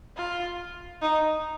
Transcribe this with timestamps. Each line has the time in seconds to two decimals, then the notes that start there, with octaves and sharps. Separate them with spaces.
0.17 F4
1.02 D#4